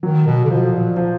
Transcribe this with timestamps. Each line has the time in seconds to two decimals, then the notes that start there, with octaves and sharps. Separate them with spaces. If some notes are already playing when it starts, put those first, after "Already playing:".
0.02 D#3 F#3
0.27 B2
0.45 D3
0.50 B2 F3
0.74 A#2
0.97 F3